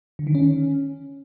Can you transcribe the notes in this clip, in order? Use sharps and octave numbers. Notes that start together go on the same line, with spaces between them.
D3
D#3
C#4